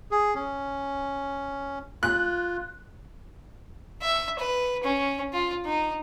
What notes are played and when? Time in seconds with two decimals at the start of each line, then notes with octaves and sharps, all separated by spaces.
0.11 G#4
0.35 C#4
2.03 F4 F#6
4.02 E5
4.39 B4
4.83 C#4
5.33 F4
5.65 D#4